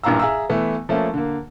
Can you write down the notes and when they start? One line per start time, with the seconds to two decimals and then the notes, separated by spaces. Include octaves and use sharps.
0.04 A1 G2 A#2 F5 A#5 E6
0.19 G#4 E5 F5 A#5 E6
0.50 E3 A3 B3
0.89 F3 A3 A#3 C#4
1.14 D3 A#3